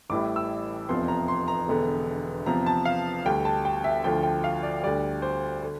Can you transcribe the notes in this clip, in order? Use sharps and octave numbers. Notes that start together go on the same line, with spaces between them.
A1 A2 E3 G3 D6
E6
F1 E2 C3 F3 C6
A#5
C6
A#5
E1 E2 D3
E2 C3 F3 A#5
A5
F5
D2 D3 G3 G5
A5
G5
E5
D2 D3 F3 G5
G5
F5
D5
D2 D3 G3 D5
C5
D3